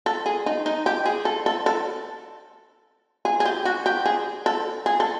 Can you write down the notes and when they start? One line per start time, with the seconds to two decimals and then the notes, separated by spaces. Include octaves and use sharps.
0.06 A4
0.26 G#4
0.46 D#4
0.66 D#4
0.86 G4
1.06 G#4
1.25 A4
1.46 A4
1.66 A4
3.25 G#4
3.40 G#4
3.45 G4
3.65 F#4
3.86 G4
4.06 G#4
4.46 A4
4.86 G#4
5.00 A4